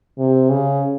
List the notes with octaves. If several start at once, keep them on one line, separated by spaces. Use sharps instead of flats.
C3
C#3